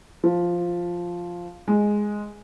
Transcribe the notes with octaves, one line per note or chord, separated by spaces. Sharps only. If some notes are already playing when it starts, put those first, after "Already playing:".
F3
G#3